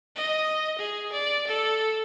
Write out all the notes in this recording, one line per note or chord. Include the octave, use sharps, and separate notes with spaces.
D#5
G#4
D5
A4